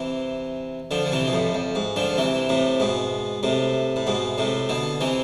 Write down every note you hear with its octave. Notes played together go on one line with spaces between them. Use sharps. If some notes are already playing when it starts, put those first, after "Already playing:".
Already playing: C3 E3
D3 F3
D3
C3 E3
B2
F2 A2
F2
G#2
D3 F3
C3 E3
A2 C3
G#2 B2
A2 C3
A2
G#2 B2
A2 C3
B2 D3
C3 E3